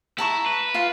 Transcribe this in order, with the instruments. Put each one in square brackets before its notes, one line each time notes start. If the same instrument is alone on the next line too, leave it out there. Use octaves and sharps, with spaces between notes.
[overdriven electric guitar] E4 [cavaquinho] A5 A#5 C#6
[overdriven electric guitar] B4
[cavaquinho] F4 F5